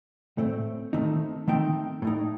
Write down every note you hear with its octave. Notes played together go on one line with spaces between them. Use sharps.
A2 A3 C4
D#3 A3 C4 D#4
D#3 A3 C4 D#4 G5
A2 A3 D#4